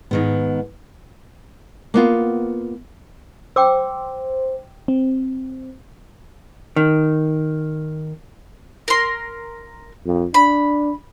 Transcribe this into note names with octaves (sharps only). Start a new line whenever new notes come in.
G#2 D#3 B3
A#3 B3 F4
C5 G5 D6 E6
C4
D#3
A#4 C6
F2
D4 B5